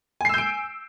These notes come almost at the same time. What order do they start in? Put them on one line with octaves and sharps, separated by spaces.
G#5 C7 E6 G6 D7